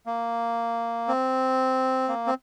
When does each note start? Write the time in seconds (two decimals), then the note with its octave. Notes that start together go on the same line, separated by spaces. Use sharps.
0.06 A#3
1.08 C4
2.09 A#3
2.27 C4